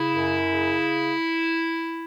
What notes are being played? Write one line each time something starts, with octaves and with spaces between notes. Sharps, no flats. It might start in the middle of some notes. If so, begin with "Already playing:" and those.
Already playing: C#3 E4
F#2
C#3